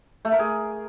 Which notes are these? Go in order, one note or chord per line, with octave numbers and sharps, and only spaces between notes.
A3
A#4
G#4